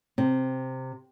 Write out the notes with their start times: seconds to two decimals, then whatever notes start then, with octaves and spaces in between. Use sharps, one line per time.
0.18 C3